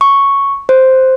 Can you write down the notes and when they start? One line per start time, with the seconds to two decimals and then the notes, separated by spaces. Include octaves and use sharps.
0.01 C#6
0.69 C5